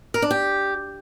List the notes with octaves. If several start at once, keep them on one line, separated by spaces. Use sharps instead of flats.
A#4
D4
G4